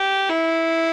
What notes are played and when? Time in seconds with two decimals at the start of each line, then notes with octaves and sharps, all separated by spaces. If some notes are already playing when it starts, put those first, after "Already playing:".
Already playing: G4
0.30 E4